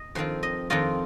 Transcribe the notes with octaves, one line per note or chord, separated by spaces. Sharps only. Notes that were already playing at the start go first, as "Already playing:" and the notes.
Already playing: D#5
F2 D#3 C4 F4 C5
D#5
F2 D#3 C4 F4 D#5